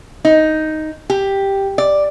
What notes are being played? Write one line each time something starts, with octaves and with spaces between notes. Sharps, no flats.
D#4
G4
D5